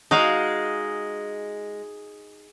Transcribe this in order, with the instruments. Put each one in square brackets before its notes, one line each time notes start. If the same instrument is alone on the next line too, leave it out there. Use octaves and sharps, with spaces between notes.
[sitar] G#3 [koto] D#4 F#4 F5